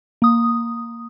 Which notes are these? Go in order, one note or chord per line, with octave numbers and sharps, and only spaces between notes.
A#3 D#6